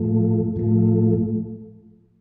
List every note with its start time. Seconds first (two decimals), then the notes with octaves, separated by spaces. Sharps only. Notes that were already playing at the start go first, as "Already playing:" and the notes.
Already playing: A2 F3 A3
0.56 A2 F3 A3